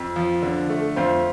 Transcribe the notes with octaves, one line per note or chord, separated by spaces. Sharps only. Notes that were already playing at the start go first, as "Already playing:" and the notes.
Already playing: F2
F3
D3
A3
F2 C5 F5